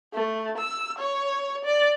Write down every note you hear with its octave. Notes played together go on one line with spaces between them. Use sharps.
A3
E6
C#5
D5